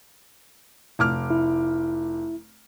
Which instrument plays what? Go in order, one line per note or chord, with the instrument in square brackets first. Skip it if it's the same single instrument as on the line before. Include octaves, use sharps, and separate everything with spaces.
[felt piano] F1 D6 F6
[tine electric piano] E4